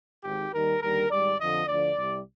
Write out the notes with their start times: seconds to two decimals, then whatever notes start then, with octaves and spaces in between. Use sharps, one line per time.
0.24 G#1 G#2 D#3 G4
0.53 D#2 D#3 G3 A#4
0.82 D#2 D3 G3 A#4
1.11 G#1 G#2 G3 D5
1.39 F2 D3 F3 D#5
1.67 D2 D3 F3 D5
1.97 C2 C3 G3